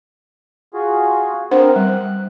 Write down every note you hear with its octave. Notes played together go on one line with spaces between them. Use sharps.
F4 F#4 G#4
B3 C4 D4 A#4 C5 F#5
G3 F#6